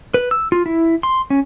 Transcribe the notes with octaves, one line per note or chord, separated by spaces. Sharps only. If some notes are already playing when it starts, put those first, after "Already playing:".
B4
E6
F4
E4
C6
C#4